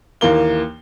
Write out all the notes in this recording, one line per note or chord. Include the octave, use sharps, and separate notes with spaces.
D#2 E3 A#3 G7